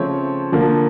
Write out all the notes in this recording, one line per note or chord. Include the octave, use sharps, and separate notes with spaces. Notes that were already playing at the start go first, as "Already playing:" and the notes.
Already playing: C#3 F3 A3 C4 C#5
D3 F3 A#3